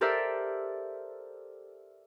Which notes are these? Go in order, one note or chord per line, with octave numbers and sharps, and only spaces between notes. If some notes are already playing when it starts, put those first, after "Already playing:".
G4 A4 A#4 C5 D5 E5